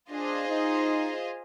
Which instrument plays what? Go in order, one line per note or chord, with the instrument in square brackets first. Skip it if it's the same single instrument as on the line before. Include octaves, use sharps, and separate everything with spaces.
[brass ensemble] D4 [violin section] F4 G#4 C5 D#5
[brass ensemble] D#4